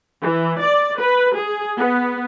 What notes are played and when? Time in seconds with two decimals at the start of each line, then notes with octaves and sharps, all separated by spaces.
0.21 E3
0.61 D5
1.00 B4
1.35 G#4
1.76 B3